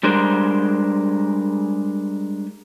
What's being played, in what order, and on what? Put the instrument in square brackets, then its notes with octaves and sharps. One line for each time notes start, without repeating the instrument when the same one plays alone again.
[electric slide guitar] G3 G#3 D4 A#4 C5